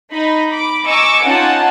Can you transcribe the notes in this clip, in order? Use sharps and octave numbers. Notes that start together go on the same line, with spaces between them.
D#4 B5
B5 D6
D#5 G#5 A#5 C#6 D6 E6
C#4 D#4 F4 F#5 G#5 A5